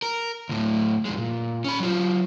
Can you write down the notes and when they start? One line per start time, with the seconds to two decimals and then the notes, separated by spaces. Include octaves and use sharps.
0.02 A#4
0.49 D2 A2
1.05 F2 G#3
1.18 A#2
1.64 C#4 B5
1.80 F#3 F4